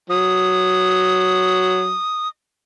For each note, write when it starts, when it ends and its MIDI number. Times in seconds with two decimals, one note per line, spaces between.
0.10 1.94 54
0.10 2.28 87